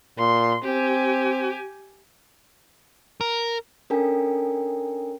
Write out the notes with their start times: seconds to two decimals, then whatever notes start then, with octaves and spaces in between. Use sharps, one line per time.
0.18 A#2 C6
0.64 C4 G4 G#5
3.21 A#4
3.90 C#4 D4 A4 A#4 G5 G#5